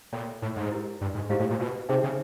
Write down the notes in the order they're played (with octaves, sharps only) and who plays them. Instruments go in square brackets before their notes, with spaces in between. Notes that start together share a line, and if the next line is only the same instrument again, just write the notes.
[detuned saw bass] A#2 [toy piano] A4 C#5 E5 G5 B5
[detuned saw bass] A2
G#2
[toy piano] E4 G4 A#4
[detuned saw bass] G2
G#2
[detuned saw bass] G#2 [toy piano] E4 G4 C5 F5
[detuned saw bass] A2
A#2
B2
[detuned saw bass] C3 [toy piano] D#4 G#4 C5 E5 G5
[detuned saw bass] C#3